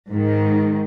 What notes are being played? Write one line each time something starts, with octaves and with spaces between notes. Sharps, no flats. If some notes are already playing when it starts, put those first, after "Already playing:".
G#2 D#3